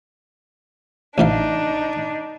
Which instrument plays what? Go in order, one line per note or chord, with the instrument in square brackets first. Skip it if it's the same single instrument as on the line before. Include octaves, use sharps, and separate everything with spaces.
[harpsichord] A1 C3 F5 [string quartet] D4 D#4